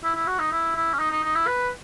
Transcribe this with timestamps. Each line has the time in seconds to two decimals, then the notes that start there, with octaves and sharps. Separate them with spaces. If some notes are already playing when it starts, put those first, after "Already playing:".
0.04 E4
0.15 E4
0.27 F#4
0.39 D#4
0.52 E4
0.76 E4
0.94 C#4
0.99 D#4
1.11 D#4
1.23 D#4
1.35 E4
1.47 B4